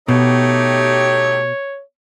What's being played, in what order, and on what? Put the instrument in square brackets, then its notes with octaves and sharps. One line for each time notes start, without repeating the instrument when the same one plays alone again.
[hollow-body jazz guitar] B2 [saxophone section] A3 D#4 G4 [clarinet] C#5